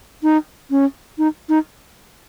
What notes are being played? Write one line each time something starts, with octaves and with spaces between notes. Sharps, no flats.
D#4
C#4
D#4
D#4